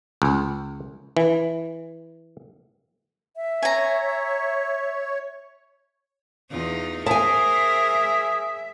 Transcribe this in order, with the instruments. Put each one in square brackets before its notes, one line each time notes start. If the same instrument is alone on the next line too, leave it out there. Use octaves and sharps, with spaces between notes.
[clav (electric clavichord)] C#2
E3
[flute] E5
[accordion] C#5 [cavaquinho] G#5 A#5
[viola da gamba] E2 D#4 F4
[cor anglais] G#4 [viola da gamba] A#4 C5 [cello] E5 [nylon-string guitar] G#5 A5